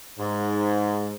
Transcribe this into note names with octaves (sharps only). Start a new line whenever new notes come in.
G#2